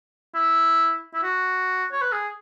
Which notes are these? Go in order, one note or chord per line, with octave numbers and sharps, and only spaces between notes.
E4
E4
F#4
C#5
B4
G#4